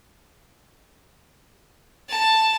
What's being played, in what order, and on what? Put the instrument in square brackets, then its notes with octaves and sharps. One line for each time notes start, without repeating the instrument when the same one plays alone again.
[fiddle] A5